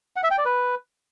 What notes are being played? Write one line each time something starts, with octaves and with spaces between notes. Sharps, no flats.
F#5
E5
G5
D5
B4